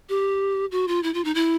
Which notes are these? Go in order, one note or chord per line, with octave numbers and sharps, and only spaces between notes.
G4
F#4
F4
E4
F4
D#4
E4